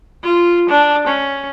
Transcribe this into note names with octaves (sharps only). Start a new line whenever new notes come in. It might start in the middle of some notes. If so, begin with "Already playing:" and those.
F4
D4
C#4